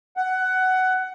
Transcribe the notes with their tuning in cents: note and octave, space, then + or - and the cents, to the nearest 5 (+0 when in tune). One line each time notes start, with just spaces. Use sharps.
F#5 +15